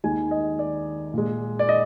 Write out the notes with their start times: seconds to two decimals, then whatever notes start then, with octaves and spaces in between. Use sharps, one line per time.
0.04 D#2 D#3 G#3 G#5
0.31 D#5
0.59 D5
1.14 A#2 G#3
1.59 D5
1.69 D#5